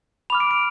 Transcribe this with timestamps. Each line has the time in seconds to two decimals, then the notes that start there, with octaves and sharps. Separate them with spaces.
0.30 B5 D6 F6 F7
0.40 D7
0.51 D7